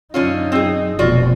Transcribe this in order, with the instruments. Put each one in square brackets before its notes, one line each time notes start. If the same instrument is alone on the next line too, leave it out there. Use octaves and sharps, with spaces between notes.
[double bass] F#2 D#4 [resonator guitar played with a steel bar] D3 C#4 F4
[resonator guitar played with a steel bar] C4 G#4
[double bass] F1 B2 [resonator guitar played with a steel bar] F4 F#4 D5